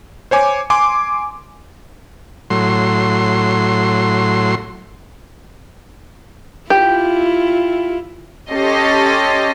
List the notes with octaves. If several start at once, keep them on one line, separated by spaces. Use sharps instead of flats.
C5 C#5 G#5 D6
G#5 C6 D6
A2 F#3 C6
E4 F4 G4
C#4 G4 A4 D#5 C6